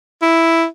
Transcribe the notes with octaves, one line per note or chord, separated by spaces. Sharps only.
E4